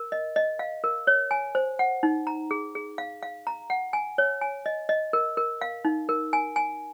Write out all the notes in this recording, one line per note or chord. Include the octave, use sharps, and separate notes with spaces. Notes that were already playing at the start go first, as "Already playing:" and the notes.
Already playing: A#4
D#5
D#5
F5
A#4
C#5
G#5
C5
F#5
D#4
A#5
G#4
G#4
F5
F5
A#5
F#5
G#5
C#5
G#5
D#5
D#5
A#4
A#4
F5
D#4
A#4
G#5
G#5